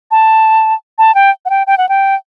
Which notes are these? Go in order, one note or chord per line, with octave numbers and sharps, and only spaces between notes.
A5
A5
G5
F#5
G5
G5
F#5
G5